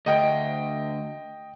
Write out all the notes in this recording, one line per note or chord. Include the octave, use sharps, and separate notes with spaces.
D2 D#5 G5 D7